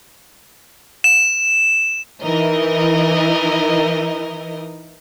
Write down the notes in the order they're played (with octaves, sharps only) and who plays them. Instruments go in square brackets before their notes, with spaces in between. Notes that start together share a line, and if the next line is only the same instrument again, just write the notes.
[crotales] E7
[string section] E3 D#4 E4 A#4 D#5